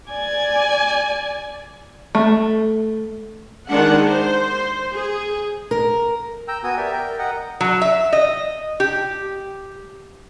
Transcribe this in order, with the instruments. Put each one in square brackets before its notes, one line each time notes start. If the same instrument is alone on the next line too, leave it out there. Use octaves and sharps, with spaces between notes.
[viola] D5 G#5
[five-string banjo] A3
[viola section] D#3 G#3 D4 F#5
C5
G#4
[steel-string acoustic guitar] A#4
[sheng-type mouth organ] G5 A#5 E6
B3 F#4 G5 G#5 D#6
G4 A#4 D5 E5
A#4 G5
A#4 D#5 F#5
[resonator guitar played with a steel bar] F#3
E5
D#5
G4